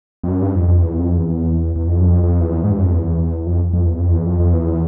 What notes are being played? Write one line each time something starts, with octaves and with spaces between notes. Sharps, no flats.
F2
F#2
G2
F2
F2
E2
F2
E2
E2
F2
F#2
F2
F2
E2
G#2
G2
F#2
F2
E2
F2
F2
E2
F2
E2
F2
F2
E2